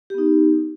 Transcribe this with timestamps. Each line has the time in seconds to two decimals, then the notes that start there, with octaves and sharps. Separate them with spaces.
0.10 G4
0.14 B3
0.18 D#4